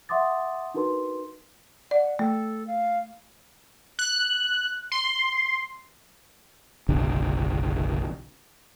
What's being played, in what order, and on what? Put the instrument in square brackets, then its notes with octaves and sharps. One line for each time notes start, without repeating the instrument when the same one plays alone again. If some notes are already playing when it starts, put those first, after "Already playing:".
[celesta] E5 F#5 C6 D6 D#6 A6
D4 D#4 F#4 A#4 B4 C6
[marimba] D5 [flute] F#5
[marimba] A3 [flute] A4
[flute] F5
[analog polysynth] F#6
C6
[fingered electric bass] F#1 B1 D3